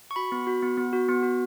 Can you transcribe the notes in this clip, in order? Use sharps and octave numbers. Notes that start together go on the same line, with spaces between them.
C#6
F#4 B5
B3
F#4
B3
B3
F#4
B3
F#4